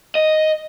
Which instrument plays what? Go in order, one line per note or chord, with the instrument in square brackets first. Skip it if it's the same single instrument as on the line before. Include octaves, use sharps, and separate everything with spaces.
[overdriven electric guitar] D#5